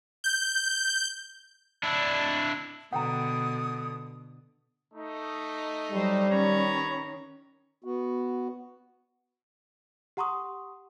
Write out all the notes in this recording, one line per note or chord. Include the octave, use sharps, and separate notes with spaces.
G6
D4 E4
B2 D3 F#5 G5 A#5 D#6
A3 D#4
F#3 G3 C5
D#3 C#4 B4 C#5 A#5
B3 F#4
G4 F#5 A#5 C6 C#6 D#6